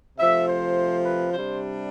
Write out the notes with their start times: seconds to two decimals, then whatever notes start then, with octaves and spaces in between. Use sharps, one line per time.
0.18 C3 F3 A3 E5
0.48 C5
1.05 B4
1.33 C3 G3 D4 C5